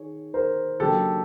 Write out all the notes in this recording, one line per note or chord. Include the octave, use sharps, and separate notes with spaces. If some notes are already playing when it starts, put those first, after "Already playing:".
Already playing: D#3 G#4 C#5
A#4 C5
C#3 F#3 A#3 D4 G4 A4